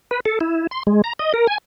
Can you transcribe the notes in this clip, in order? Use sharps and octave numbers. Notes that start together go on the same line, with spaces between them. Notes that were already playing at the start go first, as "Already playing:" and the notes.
B4
A4
E4
C6
G#3
A#5
D#5
A#4
G#5